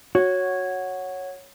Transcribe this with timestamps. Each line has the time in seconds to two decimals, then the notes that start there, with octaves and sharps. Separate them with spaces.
0.15 F#4 C#5 F#5 G#6